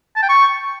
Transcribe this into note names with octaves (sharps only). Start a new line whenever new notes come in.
A5
G5
C#6